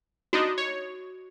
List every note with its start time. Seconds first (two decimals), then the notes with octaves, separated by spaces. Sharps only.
0.33 D4 D#4 F#4 D#5
0.58 C#5